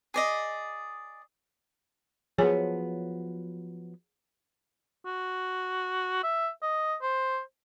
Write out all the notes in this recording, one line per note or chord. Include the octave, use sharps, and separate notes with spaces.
G#4 D5 D#5
F3 F#3 B3 G#4 C#5 G#5
F#4
E5
D#5
C5